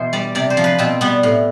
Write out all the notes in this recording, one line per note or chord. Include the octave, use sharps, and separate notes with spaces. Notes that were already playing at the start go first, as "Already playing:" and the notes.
Already playing: B2 E3 C5
G3 D5
C3 D5
C5
F3
B4
B2 C4
G3 B3
A2